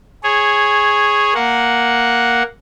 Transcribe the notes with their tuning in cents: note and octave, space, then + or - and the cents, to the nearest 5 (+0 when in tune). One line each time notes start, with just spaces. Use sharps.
G#4 +0 C#5 -10
A#3 +0 F#5 -5